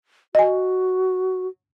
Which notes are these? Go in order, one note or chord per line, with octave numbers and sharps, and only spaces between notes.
F#4 D#5 G#5